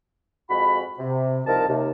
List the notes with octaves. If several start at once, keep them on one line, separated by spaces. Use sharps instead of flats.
F2 G#3 F#4 B5
C3
C2 F3 D#4 A#4 A5
D#2 C3